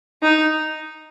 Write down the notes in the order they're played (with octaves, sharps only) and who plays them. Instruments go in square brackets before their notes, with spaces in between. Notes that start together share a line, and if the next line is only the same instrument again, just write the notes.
[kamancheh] D#4